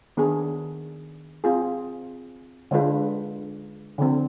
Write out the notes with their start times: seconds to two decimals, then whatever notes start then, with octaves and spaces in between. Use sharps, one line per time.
0.17 D#3 B3 D4 G#4
1.44 C4 F4 G#4
2.71 D3 G#3 D4 F4 B4
3.98 D3 F3 C4